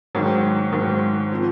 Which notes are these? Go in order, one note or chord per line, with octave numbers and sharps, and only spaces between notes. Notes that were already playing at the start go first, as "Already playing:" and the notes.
G#2 D#3 F#3
G#2 D#3 F#3
F3 C4